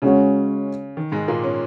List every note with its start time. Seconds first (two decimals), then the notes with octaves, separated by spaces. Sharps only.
0.02 C#3 G#3 C#4 F#4 C#5
0.97 D#3
1.12 G#2 G#3
1.28 A#2 A#3
1.44 C#4